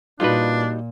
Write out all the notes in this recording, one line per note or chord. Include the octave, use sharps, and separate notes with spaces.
A#2 G3 D4 D#4 F4 F#4 B4